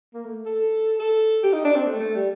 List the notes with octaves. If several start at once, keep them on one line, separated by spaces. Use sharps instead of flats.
A#3
A3
A4
A4
G4
D#4
D4
C4
A3
A3
G3